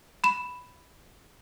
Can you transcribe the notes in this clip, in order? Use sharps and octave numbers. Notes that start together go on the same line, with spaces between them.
B5 E7